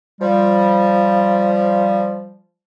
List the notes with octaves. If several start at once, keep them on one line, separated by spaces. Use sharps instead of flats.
F3 G3